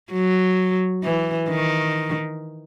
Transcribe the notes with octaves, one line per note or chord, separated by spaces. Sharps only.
F#3
E3
D#3